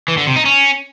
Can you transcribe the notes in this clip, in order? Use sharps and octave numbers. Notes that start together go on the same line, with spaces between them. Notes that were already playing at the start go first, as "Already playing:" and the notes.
E3
D3
C3
D#4
C#4